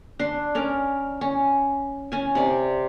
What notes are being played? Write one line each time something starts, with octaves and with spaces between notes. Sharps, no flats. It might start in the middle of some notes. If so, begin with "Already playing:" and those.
D4 C6
C#4 A#4 D5
C#4
C#4 G#5
C3 D5